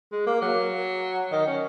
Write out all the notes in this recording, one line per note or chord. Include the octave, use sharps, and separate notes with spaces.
G#3
A#3
F#3
D#3
C#4